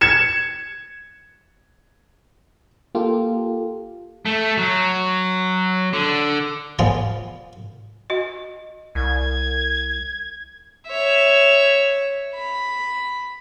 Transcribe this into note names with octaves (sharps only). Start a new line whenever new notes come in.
G#6 C#7 E7
A#3 F4 G4 A4
A3
F#3
D3
F3 B3 F4 G#4 D5 F5
F#4 D#5
C2 G#6
C#5 E5
B5